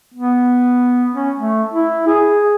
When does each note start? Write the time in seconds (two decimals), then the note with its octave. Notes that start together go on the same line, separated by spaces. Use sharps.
0.14 B3
1.14 C#4
1.36 A3
1.73 E4
2.07 G#4